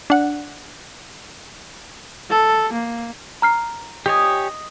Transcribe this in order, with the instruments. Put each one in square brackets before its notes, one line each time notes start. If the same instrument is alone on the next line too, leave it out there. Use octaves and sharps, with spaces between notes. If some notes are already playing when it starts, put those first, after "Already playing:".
[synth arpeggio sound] D4 F#5
[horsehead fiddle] A4
A#3
[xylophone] A#5 F6 C7
[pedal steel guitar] G4 C#5 G#5 [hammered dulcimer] D#5